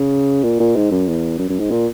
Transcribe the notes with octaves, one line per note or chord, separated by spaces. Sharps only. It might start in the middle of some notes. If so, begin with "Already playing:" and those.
Already playing: C#3
A#2
A#2
G#2
F#2
E2
F#2
F#2
G#2
A#2